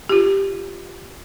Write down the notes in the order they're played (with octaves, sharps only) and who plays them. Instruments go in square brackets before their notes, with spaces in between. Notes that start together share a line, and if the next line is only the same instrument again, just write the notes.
[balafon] F4 G4